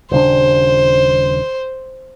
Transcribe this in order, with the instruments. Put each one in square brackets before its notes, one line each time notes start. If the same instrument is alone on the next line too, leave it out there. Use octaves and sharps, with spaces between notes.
[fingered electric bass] D#1 C#3 D4 [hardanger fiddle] C5